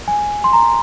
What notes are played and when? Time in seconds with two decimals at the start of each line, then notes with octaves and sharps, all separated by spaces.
0.08 G#5
0.44 C6
0.53 A#5